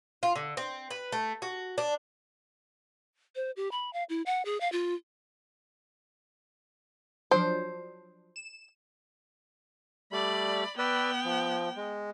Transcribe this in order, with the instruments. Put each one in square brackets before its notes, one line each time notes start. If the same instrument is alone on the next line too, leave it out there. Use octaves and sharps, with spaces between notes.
[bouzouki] F4
D3
C4
B4
A3
F#4
D4
[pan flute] C5
G4
B5
F5
E4
F#5
G#4
F5
F4
[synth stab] F3 F#3 D4 [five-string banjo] C5
[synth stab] E7
[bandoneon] G3 A3 [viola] D5 B5
[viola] B3 G5 [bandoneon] B4 D5 E6
[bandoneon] F3
G#3